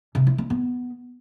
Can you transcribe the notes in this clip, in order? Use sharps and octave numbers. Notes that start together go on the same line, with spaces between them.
C3
E4
C4
B3